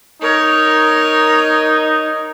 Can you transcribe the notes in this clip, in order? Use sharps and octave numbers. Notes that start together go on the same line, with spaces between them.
D#4 A#4 C#5